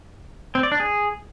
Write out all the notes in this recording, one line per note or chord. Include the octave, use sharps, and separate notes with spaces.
C4
D5
D4
G#4